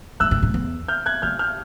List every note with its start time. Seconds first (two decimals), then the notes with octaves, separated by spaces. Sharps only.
0.20 G2 E6 F#6
0.31 G#2
0.43 A2
0.54 E2
0.88 F6 G6
1.06 F#6 G#6
1.22 E2 F6 G6
1.39 F6 G6